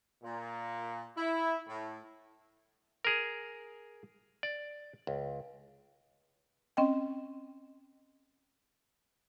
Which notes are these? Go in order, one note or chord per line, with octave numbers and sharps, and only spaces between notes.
A#2
E4
A2
G#4 A#4
D5
C#2
C4 C#4 D#5 G5